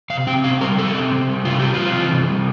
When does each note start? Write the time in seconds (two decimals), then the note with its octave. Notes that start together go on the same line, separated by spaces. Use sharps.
0.10 C3 F5
0.27 C4 G5
0.44 C3 F5
0.61 G3 A#4
0.78 C3 A4
0.94 C4
1.12 C3
1.29 G3
1.45 C3 F4
1.60 G3 G4
1.74 F4
1.79 C4
1.97 E3
2.12 C3
2.30 G3